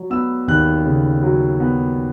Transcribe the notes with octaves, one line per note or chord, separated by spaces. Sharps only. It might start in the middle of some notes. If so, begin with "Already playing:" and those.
Already playing: F#3
B3 E6
D#2 F#6
C#3
F#3
B3